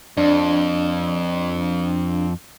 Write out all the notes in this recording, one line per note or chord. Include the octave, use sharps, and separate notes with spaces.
F2 D4